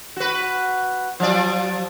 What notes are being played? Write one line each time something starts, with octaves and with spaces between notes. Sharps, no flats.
F#4 B4
F3 F#3 D5